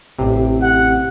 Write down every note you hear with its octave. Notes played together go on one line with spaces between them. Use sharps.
A1 C3
F#5